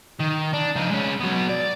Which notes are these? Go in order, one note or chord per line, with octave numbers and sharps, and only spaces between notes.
D#3
D4
F3 D#4
G#3 C#4
F#3 B3
D5